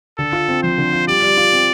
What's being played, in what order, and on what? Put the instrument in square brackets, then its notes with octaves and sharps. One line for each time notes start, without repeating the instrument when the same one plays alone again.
[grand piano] D3 [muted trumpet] A4
[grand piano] F4
C4
[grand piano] F3 [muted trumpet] C5
[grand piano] D3
F4
[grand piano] G3 [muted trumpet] D5
[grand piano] G3
F4
C4